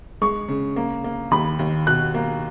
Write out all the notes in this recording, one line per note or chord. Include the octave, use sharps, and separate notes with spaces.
G#3 C#6
C#3
A#3
A#3
D#2 B5
D#2
B2 F#6
A#3